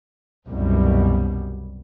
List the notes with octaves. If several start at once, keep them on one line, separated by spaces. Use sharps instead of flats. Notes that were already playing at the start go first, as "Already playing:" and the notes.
C2 F#2 B2 G3